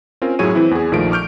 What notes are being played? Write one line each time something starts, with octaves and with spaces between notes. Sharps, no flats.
C4 C#4 F4 A#4
F#2 A2 F#3 G#4 C#5 D#7
E3 C4 E4
E2 G#4
A#1 D#3 F3 A3 F4 D7
C#6 D6 F6 G6 D7